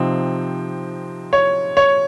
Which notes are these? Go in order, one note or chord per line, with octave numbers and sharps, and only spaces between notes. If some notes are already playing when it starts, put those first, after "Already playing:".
Already playing: C3 F3 C4 D#4
C#5
C#5